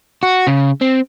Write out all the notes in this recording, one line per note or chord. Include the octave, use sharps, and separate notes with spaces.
F#4
C#3
C4